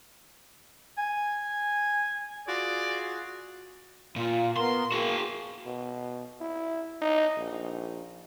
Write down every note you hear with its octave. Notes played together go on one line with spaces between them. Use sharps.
G#5
F4 F#4 G#4 D5
A#2 F4
B3 A#4 C6
A#3 F#4 G#4
B2
E4
D#4
A#1